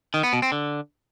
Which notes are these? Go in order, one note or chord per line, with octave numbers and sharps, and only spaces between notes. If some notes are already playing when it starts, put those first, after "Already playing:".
D#3
B3
B2
C4
D3